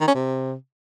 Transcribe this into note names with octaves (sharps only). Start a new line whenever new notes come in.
D#3
C#4
C3